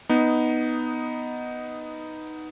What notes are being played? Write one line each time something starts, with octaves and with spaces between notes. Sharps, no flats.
B3 D#4